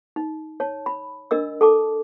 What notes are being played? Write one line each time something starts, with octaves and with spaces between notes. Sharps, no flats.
D#4
C#5 A5
B5
D4 A#4 D#5 E6
A4 A5 D6